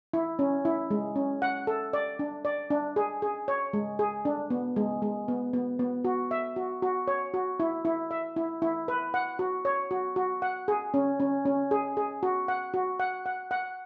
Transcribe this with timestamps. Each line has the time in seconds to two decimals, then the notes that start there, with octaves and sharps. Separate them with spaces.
0.13 E4
0.39 C#4
0.65 E4
0.91 G#3
1.16 C#4
1.42 F#5
1.67 A4
1.93 D5
2.19 D4
2.45 D5
2.70 D4
2.96 G#4
3.22 G#4
3.48 C#5
3.73 G#3
3.99 G#4
4.25 D4
4.50 B3
4.76 G#3
5.02 G#3
5.28 B3
5.53 B3
5.79 B3
6.05 F#4
6.31 E5
6.56 F#4
6.82 F#4
7.08 C#5
7.34 F#4
7.60 E4
7.85 E4
8.11 E5
8.36 E4
8.62 E4
8.88 B4
9.14 F#5
9.39 F#4
9.65 C#5
9.91 F#4
10.16 F#4
10.42 F#5
10.68 G#4
10.94 C#4
11.20 C#4
11.46 C#4
11.71 G#4
11.97 G#4
12.23 F#4
12.48 F#5
12.74 F#4
13.00 F#5
13.26 F#5
13.51 F#5